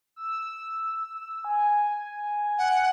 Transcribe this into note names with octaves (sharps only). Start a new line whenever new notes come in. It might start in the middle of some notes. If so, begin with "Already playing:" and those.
E6
G#5
F#5